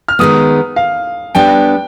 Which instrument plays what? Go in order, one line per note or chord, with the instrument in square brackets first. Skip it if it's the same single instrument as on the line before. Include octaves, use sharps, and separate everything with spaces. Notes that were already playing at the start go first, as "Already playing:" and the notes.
[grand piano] F6
[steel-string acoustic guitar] D#3 G#3 B3 [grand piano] D#6
[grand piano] F5
[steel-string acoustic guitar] G3 B3 D4 [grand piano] G5